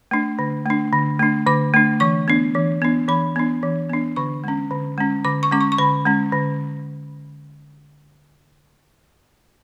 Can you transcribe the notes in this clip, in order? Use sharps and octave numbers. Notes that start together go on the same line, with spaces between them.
A3 D4
D3
A3 D4
D3
A3 D4
D3 D6
A3 D4
E3 C#6
B3 D4
E3
B3 D4
E3 B5
B3 D4
E3
B3 D4
D3 C#6
G#3 C#4
D3
G#3 C#4
D3 D6
C#6
G#3 C#4 D6
C#6
C#6
D3 B5
G#3 C#4
D3